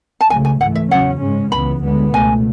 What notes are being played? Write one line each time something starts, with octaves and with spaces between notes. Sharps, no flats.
A5
C#2 C#3 F#3 A3 G#5
G#5
G#2 E3 A3 F#5
E5
E2 C#3 F#3 C#4 F#5
G#2 G#3 C#4
C#2 C#3 E3 B3 B5
D2 D3 G#3 B3
C#2 B2 A3 G#5